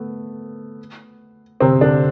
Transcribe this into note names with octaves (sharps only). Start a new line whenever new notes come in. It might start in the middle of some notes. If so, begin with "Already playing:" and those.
Already playing: A3 B3
C3 C4
D3 D4